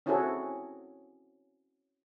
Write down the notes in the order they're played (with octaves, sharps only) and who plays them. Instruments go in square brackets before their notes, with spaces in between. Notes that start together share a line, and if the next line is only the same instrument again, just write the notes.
[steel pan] C4 C#4 E4 F#4 G#4 A4